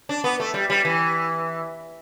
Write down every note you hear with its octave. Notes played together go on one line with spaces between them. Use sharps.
D4
B3
A3
G3
G3
E3